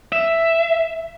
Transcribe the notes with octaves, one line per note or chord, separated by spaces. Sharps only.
E5